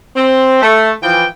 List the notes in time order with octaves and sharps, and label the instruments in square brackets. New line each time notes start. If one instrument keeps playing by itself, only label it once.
[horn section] C4
A3
E3 F3 G5